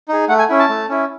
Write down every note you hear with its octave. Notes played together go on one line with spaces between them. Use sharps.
D#4 G#4
A3 F#5
G#5
C#4 E4
A5
A3
C#4 E4